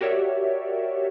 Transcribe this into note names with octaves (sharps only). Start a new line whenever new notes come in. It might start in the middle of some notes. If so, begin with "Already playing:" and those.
F#4 G4 A#4 C#5 D5 E5